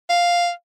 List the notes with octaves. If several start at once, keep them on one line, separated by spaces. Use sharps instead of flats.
F5